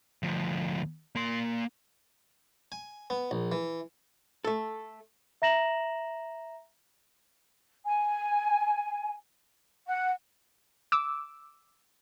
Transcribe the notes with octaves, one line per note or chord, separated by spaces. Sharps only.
D2 F3
A#3 C6
G#5
B3
A#1
E3
A3 A4
E5 A#5 A#6 E7 F#7
G#5
F#5
D6 E6